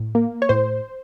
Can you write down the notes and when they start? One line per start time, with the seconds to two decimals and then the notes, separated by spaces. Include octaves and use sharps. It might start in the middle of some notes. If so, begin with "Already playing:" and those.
Already playing: A2
0.15 A#3
0.42 C#5
0.49 A2 C5